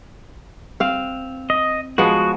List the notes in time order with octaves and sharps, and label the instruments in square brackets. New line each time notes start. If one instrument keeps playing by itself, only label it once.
[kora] C4 F5
[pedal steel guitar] D#5
[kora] F3 G#3 B3 [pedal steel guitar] F#4